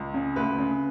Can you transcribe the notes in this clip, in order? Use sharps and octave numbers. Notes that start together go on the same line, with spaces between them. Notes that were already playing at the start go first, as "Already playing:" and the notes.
Already playing: C#2
C#3
D2 B4
C#3